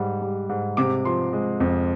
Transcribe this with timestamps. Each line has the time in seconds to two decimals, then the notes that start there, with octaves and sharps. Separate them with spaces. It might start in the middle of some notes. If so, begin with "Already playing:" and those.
Already playing: G#2 G3
0.22 G3
0.49 G#2
0.77 C3 D6
1.05 F3 C6
1.33 G#3
1.60 F2